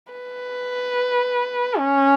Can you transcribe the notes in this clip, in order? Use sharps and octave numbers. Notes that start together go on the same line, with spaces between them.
B4
C#4